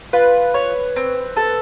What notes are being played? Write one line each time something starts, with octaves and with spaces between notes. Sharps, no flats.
F4 B4
C#5
C4
A4